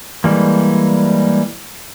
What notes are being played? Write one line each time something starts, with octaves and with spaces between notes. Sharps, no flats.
E3 G3 G#3 A#3